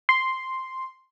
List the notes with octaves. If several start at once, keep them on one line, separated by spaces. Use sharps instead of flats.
C6